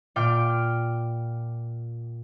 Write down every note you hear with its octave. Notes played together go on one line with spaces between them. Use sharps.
A#2 G5 D6 F6